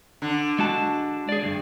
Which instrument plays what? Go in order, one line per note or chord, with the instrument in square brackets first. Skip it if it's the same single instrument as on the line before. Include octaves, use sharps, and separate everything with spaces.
[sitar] D3
[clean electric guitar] G#3 F#4 A5
G#4 D5
D2 G2